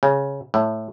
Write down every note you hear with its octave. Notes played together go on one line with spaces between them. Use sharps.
C#3
A2